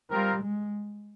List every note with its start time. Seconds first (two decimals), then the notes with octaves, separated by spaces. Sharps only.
0.10 G3 C4 F4 A#4
0.42 G#3